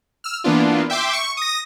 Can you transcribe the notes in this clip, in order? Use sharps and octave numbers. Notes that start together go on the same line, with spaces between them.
E6 F6
E3 A#3 B3 D4 F4
E5 G5 C6 D6
C#6
D#6 A#6